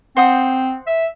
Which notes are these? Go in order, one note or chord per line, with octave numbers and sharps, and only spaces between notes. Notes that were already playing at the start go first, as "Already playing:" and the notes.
C4 C5 F#5 D#6
E5